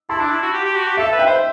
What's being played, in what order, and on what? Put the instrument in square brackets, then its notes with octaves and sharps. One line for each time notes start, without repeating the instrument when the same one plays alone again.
[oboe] E4 [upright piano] A5 C6
[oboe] D4
E4
F#4
G4
G4
F#4
G4
[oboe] A4 [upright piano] E5
[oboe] B4
[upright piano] E5 G5
[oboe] C5